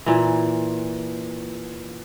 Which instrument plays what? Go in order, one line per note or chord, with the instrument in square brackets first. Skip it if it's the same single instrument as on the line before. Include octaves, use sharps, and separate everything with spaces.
[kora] A#2 E3